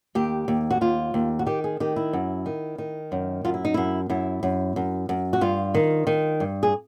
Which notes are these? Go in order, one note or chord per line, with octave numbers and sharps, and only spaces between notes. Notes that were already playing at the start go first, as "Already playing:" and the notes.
D#2 G4
D#2
F#4
D#2 F4
D#2
F#4
D#3 G4
G#4
D#3 G4
E4
F#2
D#3
D#3
F#2
F#2 F4
E4
D#4
F#2 E4
F#2 E4
F#2
F#2
F#2
F#4
G2 F4
D#3
D#3
G2
G#4